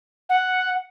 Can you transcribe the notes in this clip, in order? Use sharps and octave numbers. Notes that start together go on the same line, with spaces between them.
F#5